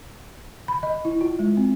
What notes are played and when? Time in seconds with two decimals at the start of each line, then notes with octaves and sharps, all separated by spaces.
0.68 B5
0.83 D#5
1.05 E4
1.21 F4
1.39 G#3
1.57 C4